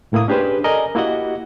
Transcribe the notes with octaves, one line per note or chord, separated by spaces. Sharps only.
C2 A2 A#3 E4 D#6
C#4 D4 G4 G#4 B4 C5
A4 A#4 D5 D#5 G#5 A#5
A#3 E4 F#4 G4 D#5 F#5